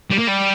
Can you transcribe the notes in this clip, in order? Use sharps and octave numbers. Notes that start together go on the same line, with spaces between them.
G3
A#3
G3